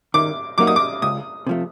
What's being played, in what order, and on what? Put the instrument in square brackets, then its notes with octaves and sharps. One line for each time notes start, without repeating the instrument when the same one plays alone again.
[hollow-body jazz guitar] D#3 [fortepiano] D6
[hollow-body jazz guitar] F#3 A#3 D#4 F#4 [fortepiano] D6
[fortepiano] D#6
D6
[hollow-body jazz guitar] C#2 [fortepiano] D#6
[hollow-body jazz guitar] C3 F3 A3